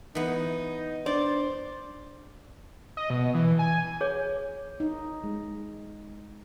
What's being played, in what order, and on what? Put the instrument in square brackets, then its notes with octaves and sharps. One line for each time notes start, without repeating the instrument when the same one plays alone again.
[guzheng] E3 B3 [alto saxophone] D#4
[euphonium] D4 [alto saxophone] C5 [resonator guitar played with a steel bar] D5
[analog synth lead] D#5
B2
E3
G#5
[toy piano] G#4 C#5
[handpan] D#4
G#3